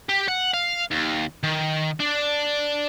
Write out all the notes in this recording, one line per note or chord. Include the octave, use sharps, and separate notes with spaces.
G4
F#5
F5
D#2
D#3
D4